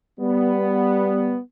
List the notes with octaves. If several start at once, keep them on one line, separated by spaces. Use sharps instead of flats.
G3 B3